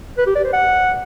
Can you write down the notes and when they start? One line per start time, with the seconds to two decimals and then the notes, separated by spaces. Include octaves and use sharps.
0.18 B4
0.26 G4
0.35 D5
0.44 C5
0.53 F#5